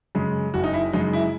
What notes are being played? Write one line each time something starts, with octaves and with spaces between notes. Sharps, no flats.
F#2 C#3 G#3
F#1 F#4
D#4
E4
F#2 C#3 G#3 D#4
E4